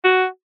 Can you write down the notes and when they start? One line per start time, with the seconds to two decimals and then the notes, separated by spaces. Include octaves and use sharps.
0.04 F#4